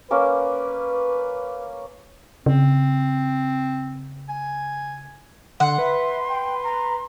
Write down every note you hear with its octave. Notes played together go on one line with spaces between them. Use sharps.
A#3 C#4 B4 D6
C#3 C4
G#5
D3 F#5 C6
B4 E5
G5
A#5